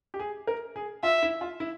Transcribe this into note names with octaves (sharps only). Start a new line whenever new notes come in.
G4
G#4
A#4
G#4
F4 E5
E4
F4
E4